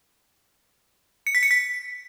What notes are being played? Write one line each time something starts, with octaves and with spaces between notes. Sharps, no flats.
C#7
B6
C#7
B6